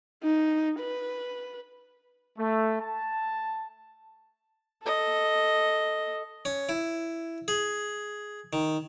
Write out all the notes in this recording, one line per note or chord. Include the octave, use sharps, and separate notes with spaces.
D#4
B4
A3
A5
A4 D#5
C#4
E4
G#4
D#3